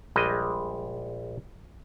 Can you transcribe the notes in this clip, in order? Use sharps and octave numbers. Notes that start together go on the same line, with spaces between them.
A#1 G3 G#3 D#5